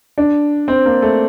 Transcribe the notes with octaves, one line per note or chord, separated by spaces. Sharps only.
D4
C4
A#3
A3